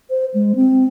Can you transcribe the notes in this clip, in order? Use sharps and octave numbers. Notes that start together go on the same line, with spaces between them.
C5
G#3
C4